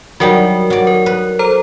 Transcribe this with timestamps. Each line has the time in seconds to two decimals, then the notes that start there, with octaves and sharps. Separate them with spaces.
0.20 F#3 G3 D#4 F#4 A#4 G5
0.70 F#3 D5
0.87 A#4
1.06 B4
1.39 A4 C5 A#5